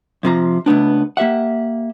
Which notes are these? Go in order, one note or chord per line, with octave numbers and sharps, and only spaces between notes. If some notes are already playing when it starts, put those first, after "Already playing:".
F2 C3 F3 A#5
C#2 A3 B3 D4
A#3 G4 E5 F#5